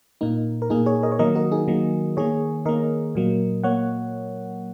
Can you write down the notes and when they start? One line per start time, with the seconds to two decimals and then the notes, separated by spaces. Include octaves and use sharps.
0.21 A#2 A#3 D#4
0.62 A#4
0.70 A#2 A#3 D#4 G#4
0.86 G#4 C#5
1.03 A#4 D#5
1.12 C#5
1.19 D#3 F#3 A#3 A#4 D#5
1.35 F#4 A#4
1.52 D#4 G#4
1.68 D#3 F#3 A#3
2.17 D#3 A#3 G#4 C#5
2.66 D#3 A#3 A#4 D#5
3.15 A#2 F#3 A#3
3.63 A#3 C#5 F#5